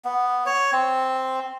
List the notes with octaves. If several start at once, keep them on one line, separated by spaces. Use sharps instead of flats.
B3
C#5
C4